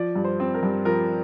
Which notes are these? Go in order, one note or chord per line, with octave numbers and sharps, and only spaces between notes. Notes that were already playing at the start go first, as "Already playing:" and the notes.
Already playing: F3 D5
G2
C5
C4
A#4
G2
F3 A#4